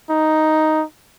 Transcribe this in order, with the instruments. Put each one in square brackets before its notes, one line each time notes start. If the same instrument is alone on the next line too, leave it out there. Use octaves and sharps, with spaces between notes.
[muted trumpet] D#4